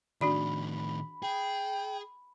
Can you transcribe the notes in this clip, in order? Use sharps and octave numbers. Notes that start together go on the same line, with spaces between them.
A2 D#3 D4 F#4 D5 B5
G#4 G5